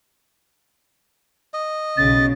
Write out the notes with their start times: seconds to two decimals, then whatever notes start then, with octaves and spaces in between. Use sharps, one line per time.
1.54 D#5
1.97 B1 C#3 A6